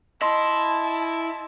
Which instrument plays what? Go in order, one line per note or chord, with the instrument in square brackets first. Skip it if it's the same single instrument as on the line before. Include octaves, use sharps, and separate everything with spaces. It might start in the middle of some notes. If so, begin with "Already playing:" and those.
[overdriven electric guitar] E4 [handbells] D#5 C6 [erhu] A5